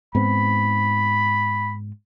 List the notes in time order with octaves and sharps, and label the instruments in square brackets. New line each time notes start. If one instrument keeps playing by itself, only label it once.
[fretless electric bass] G#2 B3 C4 [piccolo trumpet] B5